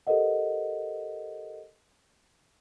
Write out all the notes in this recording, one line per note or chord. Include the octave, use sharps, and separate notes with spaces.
G4 A4 A#4 C5 D#5 F#5